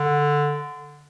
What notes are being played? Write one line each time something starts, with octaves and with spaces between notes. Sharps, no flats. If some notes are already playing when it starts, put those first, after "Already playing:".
Already playing: D3